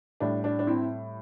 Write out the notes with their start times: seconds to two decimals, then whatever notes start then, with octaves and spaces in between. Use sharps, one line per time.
0.20 A2 G3 D4
0.44 D4
0.59 D4
0.67 C4 E4